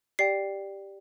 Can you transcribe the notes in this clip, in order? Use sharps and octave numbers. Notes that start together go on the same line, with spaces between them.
G4 D5 G5 C7